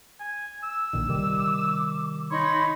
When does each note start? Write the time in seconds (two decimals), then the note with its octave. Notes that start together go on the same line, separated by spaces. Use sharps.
0.20 G#5
0.63 E6
0.93 A#1 A#2 D#3
1.08 C3 D#3 G3 D6
2.31 D#4 C#5 B5 C6